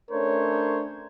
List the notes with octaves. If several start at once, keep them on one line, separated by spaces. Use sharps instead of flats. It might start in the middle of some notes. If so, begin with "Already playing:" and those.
A3 C#4 D4 A#4 C5 C#5